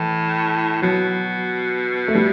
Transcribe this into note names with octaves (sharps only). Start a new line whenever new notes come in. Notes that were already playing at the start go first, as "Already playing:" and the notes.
Already playing: A2 E3
B2 F#3
A3
G3